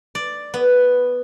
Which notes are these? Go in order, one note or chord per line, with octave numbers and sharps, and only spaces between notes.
D5
B3